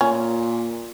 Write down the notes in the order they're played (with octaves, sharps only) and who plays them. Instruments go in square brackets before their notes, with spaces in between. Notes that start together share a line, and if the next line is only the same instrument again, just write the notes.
[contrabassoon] A#2 [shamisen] C#4